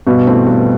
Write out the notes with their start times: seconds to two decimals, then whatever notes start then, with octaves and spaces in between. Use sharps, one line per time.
0.07 G2 B2
0.27 E3 A3 C4
0.47 G2